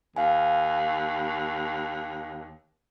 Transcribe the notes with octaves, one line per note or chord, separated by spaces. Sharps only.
D#2 F5 G#5